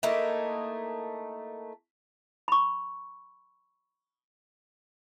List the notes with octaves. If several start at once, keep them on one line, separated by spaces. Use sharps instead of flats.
A3 A#3 D#4 E4
B5 C#6